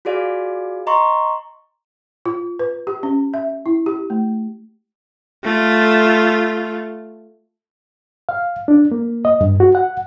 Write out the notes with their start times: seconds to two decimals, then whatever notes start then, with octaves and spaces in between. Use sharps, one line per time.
0.05 F4 F#4 G#4 D5 F5
0.87 D#5 A#5 C6 C#6
2.25 F4
2.59 B4
2.87 G4
3.03 C#4
3.34 E5
3.66 E4
3.86 G4
4.10 A3
5.44 A3 F4
8.29 F5
8.68 D4
8.92 A#3
9.25 D#5
9.41 G2
9.60 F#4
9.75 F#5